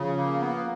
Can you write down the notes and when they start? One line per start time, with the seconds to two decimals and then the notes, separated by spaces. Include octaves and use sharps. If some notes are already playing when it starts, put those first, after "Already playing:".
Already playing: C#3 F3
0.17 A#3
0.39 B3